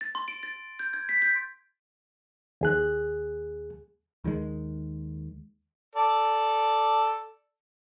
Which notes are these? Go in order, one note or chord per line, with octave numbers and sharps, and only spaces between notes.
A6
C6
D7
A6
G6
G#6
B6
G6
D#2 G#4 F#6
D#2 D#3 F3 G#3
A4 D5